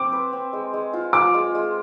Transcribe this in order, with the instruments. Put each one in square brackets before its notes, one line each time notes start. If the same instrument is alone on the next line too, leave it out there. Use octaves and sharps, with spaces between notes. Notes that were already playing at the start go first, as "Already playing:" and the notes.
Already playing: [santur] C4 [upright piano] D6
[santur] B4
C4
G#3
G#3
F4
[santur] F4 [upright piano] D6
[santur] G#3
G#3